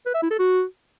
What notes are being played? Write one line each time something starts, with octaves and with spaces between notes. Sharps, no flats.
B4
E5
E4
A4
F#4